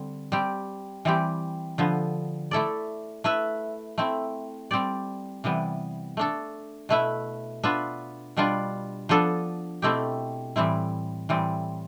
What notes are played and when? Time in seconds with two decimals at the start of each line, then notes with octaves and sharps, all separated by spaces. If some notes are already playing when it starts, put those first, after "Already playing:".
Already playing: D3 G3 C4
0.32 G3 C4 G4
1.05 E3 G3 C4 G4
1.78 D3 F3 B3
2.51 A3 E4 A4 D5
3.24 A3 E4 B4 E5
3.98 A3 C4 E4
4.71 G3 C4 G4 D5
5.44 C3 E3 G3 B3
6.17 A3 D4 A4
6.89 B2 A3 E4 B4 E5
7.63 B3 D4 F4 B4 E5
8.37 B2 G3 D4 F4 B4
9.09 F3 B3 D4 A4
9.82 B2 A3 C4 E4 G4
10.56 A2 E3 G3 C4 E4
11.29 A2 E3 G3 C4